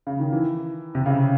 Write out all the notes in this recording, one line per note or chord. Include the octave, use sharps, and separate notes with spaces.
C#3
D#3
E3
C3
C#3